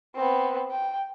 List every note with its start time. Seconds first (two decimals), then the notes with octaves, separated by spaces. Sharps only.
0.16 B3 C4
0.72 G5